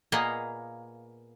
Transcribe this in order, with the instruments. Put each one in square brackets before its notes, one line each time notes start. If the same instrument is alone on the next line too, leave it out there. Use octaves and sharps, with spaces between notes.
[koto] A#2 A#3 B3 G#4 D#5 F5